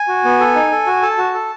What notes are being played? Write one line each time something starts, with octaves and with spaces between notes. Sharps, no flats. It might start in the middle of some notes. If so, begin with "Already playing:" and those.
Already playing: G#5
F#4
B3
A4
D#4
A4
F#4
A4 A5
F#4
A4